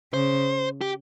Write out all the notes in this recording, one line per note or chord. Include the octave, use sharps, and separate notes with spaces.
C#3 C5
G4